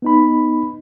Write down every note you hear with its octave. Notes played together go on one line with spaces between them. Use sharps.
B3 D#4 B5